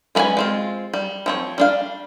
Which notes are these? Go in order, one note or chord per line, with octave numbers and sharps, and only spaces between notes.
G#3 A#3 C#4 B4 G#5
G#3 C4 F4
G3
F3 C4 C#5
G3 D4 F5